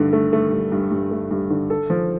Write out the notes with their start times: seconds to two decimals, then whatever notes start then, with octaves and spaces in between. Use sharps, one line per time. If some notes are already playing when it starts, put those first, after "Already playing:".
Already playing: G2 D3 A3
0.13 A3
0.33 A3
0.52 G2
0.72 G2
0.91 G2
1.11 A3
1.31 G2
1.50 D3
1.70 A4
1.90 F3